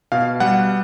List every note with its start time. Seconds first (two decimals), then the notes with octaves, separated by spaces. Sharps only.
0.12 B2 F5
0.40 G3 F#5